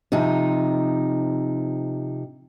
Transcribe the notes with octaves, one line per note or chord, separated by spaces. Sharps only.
C3 F3 D#4